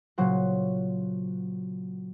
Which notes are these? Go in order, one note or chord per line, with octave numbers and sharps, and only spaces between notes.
A#2 C#3 F#3 C5 F#5